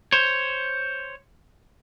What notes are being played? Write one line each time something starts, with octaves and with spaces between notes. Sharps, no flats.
C5 C#5